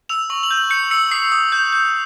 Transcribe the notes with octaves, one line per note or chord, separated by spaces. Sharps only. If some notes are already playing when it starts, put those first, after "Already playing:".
E6 F7
C#6 F#7
F#7
G6
F#7
G6 C#7
E6 C#7
D#6 C7
D#6
G6
G6